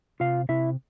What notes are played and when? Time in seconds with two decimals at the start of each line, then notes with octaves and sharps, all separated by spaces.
0.20 C3 F4 F5
0.49 C3 E4 E5